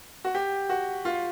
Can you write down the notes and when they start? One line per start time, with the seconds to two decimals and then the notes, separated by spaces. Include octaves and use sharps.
0.25 F#4
0.35 G4
0.69 F#4
1.05 F4